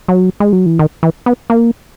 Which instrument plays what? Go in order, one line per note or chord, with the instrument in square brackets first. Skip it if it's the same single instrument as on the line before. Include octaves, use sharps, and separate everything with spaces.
[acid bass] F#3
G#3
F#3
E3
D#3
E3
B3
A#3